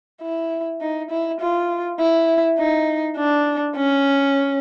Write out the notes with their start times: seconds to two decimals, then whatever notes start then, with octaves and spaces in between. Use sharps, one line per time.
0.22 E4
0.81 D#4
1.10 E4
1.40 F4
2.00 E4
2.58 D#4
3.17 D4
3.77 C#4